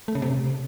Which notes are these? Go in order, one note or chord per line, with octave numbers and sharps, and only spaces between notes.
A3
C#3
C3